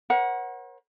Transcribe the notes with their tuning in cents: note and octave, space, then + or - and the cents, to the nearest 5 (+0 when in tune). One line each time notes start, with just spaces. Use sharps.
A#4 +45 C#5 -45 F#5 +0